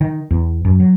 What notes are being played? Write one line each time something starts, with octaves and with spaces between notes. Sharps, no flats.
D#3
E2
F#2
F#3